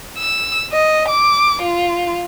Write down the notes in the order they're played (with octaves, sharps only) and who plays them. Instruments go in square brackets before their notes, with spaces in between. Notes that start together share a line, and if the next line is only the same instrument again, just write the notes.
[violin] E6
D#5
D6
F4